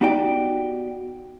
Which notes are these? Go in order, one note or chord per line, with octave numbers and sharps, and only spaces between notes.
B3 D#4 F#4 G4 D5 G5